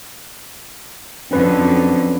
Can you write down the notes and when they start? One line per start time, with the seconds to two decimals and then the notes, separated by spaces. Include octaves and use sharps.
1.31 F2 D3 F#3 C4 C#4 B4